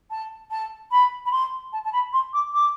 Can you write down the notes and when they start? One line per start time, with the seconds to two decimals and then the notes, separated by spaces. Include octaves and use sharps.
0.10 A5
0.51 A5
0.91 B5
1.25 B5
1.31 C6
1.72 A5
1.84 A5
1.92 B5
2.13 C6
2.33 D6
2.53 D6